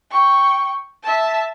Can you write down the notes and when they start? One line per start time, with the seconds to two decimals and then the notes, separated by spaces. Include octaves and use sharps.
0.11 G5 C#6
1.03 E5 A5